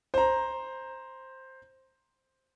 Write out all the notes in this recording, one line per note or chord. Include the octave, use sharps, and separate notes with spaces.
C5 A#5